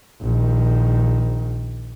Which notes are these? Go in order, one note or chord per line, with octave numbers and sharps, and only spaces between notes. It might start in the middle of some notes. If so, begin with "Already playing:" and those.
A#1 D#3